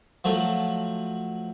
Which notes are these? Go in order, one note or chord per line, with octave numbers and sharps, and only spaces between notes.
F3 F#3 A3